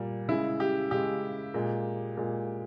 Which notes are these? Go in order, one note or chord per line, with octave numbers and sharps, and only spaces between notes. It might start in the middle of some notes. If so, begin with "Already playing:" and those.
Already playing: A#2 G3
C#3 G#3 E4
G4
C#3 G#3 G4
A#2 G#3
A#2 G#3